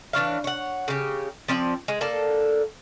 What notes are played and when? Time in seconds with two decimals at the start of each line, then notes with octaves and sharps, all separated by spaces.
0.13 E3 D4 C#5 F5
0.44 C#5 F#5
0.88 C#3 G4
1.48 F3 C4 D5 G5
1.88 G#3
2.01 A#3 A4 D5